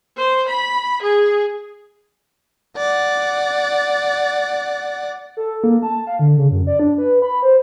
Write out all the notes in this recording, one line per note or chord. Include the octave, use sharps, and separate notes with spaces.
C5
B5
G#4
D5 F#5
A4
A#3
A5
F5
D3
C#3
F#2
D5
D4
B4
B5
C5